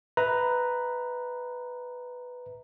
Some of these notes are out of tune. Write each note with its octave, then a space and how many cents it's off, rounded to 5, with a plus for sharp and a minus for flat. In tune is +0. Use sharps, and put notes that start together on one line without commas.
B4 +5 E5 -35 A#5 +0